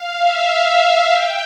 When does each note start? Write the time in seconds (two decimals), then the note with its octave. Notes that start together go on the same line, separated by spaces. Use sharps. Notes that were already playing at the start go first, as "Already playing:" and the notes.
Already playing: F5
0.18 E5
0.49 F5
0.80 F5
1.12 G5